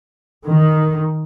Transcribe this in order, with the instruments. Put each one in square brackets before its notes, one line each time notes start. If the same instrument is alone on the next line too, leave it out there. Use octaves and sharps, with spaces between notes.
[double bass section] D#3